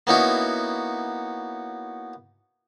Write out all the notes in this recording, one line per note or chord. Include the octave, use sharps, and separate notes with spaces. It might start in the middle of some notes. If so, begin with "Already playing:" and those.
A#3 B3 C#4 D#4 E4 F#4